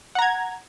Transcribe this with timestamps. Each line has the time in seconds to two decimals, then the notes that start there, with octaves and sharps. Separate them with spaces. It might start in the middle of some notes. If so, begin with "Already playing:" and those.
0.15 F#5
0.19 A#5
0.22 G#6